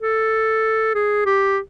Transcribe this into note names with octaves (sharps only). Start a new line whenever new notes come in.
A4
G#4
G4